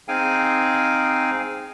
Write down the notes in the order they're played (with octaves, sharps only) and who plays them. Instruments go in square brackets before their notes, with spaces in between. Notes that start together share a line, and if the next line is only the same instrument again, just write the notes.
[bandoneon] C4 D#4 G#4 F5 G5 G#5